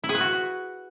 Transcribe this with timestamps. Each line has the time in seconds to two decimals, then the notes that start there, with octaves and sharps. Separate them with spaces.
0.04 E4
0.09 G#4
0.15 B4
0.20 F#4